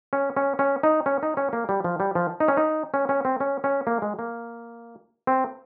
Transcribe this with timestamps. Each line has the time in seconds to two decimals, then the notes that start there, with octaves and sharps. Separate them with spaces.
0.13 C#4
0.37 C#4
0.59 C#4
0.83 D#4
1.06 C#4
1.23 D#4
1.37 C#4
1.53 A#3
1.69 G3
1.84 F3
2.00 G3
2.15 F3
2.40 D#4
2.48 C#4
2.57 D#4
2.94 C#4
3.09 C#4
3.25 C4
3.40 C#4
3.64 C#4
3.87 A#3
4.02 G#3
4.19 A#3
5.27 C4